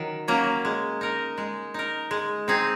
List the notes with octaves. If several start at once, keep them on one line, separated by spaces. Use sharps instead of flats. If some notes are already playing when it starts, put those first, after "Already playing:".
Already playing: D#3 F#3
F#3 A#3 C#4
G#3
D#4 A#4
G#3
D#4 A#4
G#3
C4 D#4 G#4